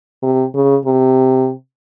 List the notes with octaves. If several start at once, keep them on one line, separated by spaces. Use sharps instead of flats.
C3
C#3
C3